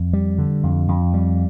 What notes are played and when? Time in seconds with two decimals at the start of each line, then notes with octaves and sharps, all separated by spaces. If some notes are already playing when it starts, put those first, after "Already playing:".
Already playing: F2
0.13 G3
0.38 D3
0.63 F2
0.88 F2
1.14 G3